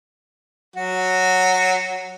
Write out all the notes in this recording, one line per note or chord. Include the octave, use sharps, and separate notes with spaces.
F#3 F#4